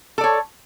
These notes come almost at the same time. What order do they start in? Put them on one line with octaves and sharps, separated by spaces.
A4 D5 C#5